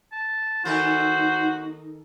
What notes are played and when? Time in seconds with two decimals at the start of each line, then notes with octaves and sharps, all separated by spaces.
0.12 A5
0.65 D#3 D#4 F#4 A4 A#4 C5